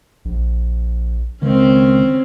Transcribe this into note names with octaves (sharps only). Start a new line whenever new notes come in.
A#1
C#2 D#3 C4 C#4